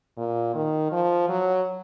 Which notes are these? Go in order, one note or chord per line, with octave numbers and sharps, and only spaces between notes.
A#2
D#3
F3
F#3